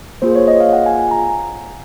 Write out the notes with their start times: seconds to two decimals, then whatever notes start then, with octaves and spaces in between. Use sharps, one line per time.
0.22 A#3 F4 G#4 C5
0.36 C#5
0.48 D#5
0.60 F5
0.73 F#5
0.86 G#5
0.99 G#5
1.11 A#5